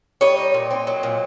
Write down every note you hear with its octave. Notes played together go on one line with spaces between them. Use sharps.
G3 C#5 D#5
D#4
A#2
C4
F#3
A#2